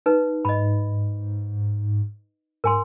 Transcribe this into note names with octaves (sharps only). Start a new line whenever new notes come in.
D#4 B4
G#2 D#5 B5
G#2 A#4 G#5 C6